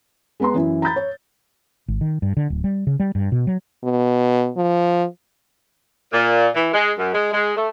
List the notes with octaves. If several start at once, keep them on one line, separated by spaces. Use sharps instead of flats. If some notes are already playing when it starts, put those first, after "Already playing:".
G#3 B3 B4 A#5 C6
F#2 E3 E4
A#5 B5 G6 A6
C#5
G#1
D#3
G2
D3
D1
G3
C#3
G3
G2
B2
F#3
B2
F3
A#2
E3
G#3
F#2
G#3
G#3
A3